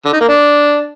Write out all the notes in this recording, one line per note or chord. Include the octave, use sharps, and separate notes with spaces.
D3
D#4
A#3
D4